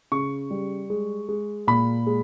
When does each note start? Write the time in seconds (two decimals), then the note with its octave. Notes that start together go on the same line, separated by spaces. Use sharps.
0.12 C#3 C#6
0.50 G3
0.90 G#3
1.29 G#3
1.67 A#2 B5
2.07 G#3